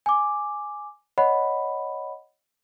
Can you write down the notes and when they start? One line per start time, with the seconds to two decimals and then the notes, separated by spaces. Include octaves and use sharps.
0.06 G#5 D6
1.18 C#5 D#5 F#5 B5